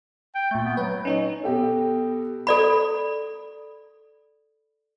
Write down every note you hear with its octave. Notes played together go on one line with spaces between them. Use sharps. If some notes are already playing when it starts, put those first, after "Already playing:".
G5
A#2 A3 G6
B3
F#3 B4
C#4 D#4 C#5
B2 G4 A4
A4 D5 B5